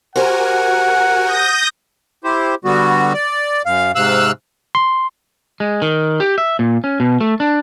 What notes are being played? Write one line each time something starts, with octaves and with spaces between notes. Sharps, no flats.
F#4 G4 A#4 C5 F#5 G#5
D#6 G6 A#6
E4 G4 C5
D3 G3 B3 F#4
D5
F#2 F5
G#2 C3 F5 E6 F#6
C6
G#3
D#3
G4
E5
A#2
C#4
B2
A3
D4